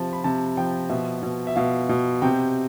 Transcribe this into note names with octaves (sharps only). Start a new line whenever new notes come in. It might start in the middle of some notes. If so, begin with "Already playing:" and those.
Already playing: C3 F3 A5
B5
C3 A5
F3 G5
B2 E5
B2
E5
B2 F5
B2
C3 G5